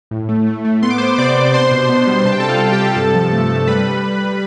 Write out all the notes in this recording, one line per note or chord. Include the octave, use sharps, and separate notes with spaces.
A2
A3
A3
A3
B3 C6
D6
B3 C5 C6
C3 D5 D6
B3
D4 C5 C6
B2
B3
G3
C3 A5
G5
C3 A4 A5
F4 F5
C3
G4 G5
C3
G2 A4 A5
F3
A3
A3
G3 B4 B5